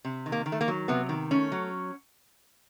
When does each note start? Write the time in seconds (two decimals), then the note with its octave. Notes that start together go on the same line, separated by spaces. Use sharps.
0.05 C3
0.26 D#3
0.32 A#3
0.46 D#3
0.52 A3
0.61 A#3
0.68 F#3
0.88 C3 B3
1.09 D#3
1.31 A3 C#4
1.52 F#3